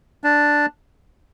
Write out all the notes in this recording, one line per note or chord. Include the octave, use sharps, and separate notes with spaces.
D4